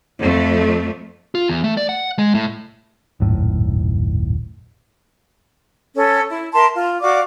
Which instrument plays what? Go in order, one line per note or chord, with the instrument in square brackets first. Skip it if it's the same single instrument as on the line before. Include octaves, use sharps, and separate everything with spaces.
[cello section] F2 A3
[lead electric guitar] F4
E2
A3
D5
F#5
G#3
A2
[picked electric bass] D#1 G#1 F#2 A2
[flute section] C#4 A4
E4
A#4 E5 A5 C6
F4
F#4 D5 F5 D6